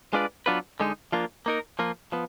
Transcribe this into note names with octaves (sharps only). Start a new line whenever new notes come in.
G#3 D4 F4 B4 D5
F#3 B3 D4 F4 B4
D3 G#3 D#4
F3 A#3 D4 F4
A#3 D#4 A#4
F3 A#3 F4
F3 B3